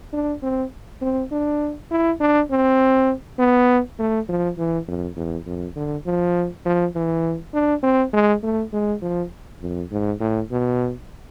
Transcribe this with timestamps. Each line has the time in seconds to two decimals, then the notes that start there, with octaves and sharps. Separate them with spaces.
0.13 D4
0.43 C4
1.02 C4
1.32 D4
1.91 E4
2.20 D4
2.50 C4
3.38 B3
3.99 A3
4.29 F3
4.58 E3
4.88 F2
5.17 E2
5.46 F2
5.76 D3
6.06 F3
6.65 F3
6.95 E3
7.54 D4
7.83 C4
8.13 G#3
8.43 A3
8.73 G#3
9.02 F3
9.62 F2
9.91 G#2
10.20 A2
10.51 B2